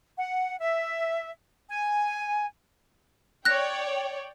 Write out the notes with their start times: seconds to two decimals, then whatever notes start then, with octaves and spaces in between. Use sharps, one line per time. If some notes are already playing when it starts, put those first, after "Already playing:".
0.17 F#5
0.60 E5
1.69 G#5
3.45 C#5 D5 G5 F#6 A#6